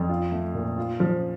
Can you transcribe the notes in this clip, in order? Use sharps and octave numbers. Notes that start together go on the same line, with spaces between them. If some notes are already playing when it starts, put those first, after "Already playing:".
Already playing: F2
F4
A3
A#2
F4
F3